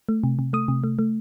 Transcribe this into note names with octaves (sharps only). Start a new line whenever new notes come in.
A3
C3
C3
A3 D#6
C3
A3
A3